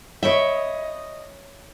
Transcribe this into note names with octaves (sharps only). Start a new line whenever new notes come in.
C#5 D#5 E5 G5 B5